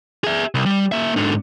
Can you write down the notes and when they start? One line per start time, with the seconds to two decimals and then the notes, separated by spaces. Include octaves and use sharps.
0.24 G#4 E5
0.55 C2
0.66 G3
0.92 A#3 E5
1.16 G#2 D3